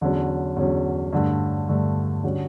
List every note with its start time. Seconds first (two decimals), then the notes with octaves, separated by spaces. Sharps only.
0.01 E2 D3 F#3 C#4
0.56 E2 D3 F#3 C#4
1.13 G2 D3 A3
1.69 G2 D3 A3
2.24 D3 G3 C#4 F#4